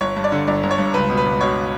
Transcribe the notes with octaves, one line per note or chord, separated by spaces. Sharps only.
G1 C#5
G2
D5
D3
G1 D5
G1
C#5
G2
C#2 B4
B2
B4
C#2
B2 C#5